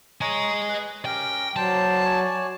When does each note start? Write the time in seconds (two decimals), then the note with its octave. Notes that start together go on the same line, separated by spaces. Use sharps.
0.21 C#5 D#5 G#5 A#5
0.69 G#4 B4
1.05 C#4 G4 A#4 G5
1.56 F#3 C5 D5 A5
2.05 C#5 D5 G#5